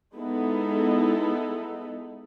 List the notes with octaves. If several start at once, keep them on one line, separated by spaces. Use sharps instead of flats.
G#3 B3 D#4 E4 A4